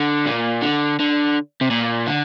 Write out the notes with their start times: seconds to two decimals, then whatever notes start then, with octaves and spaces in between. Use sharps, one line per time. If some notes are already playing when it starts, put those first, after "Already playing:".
Already playing: D3
0.27 A#2
0.62 D3
0.99 D3
1.61 C3
1.71 A#2
2.07 D3